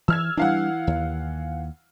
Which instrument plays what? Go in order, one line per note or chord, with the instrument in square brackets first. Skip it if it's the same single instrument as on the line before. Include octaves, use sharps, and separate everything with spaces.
[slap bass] E3 [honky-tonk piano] E6 F6 G#6
[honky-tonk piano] E3 F5 F#5 [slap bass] G3 D4
[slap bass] D#2